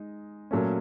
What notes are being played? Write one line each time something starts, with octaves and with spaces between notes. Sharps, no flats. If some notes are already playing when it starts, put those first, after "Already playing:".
Already playing: G#3 D#4
A#2 F#3 A3 C#4